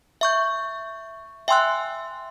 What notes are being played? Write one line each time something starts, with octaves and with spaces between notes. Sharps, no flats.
E5 C#6 G6
E5 G5 G#5 C6 E6 F#6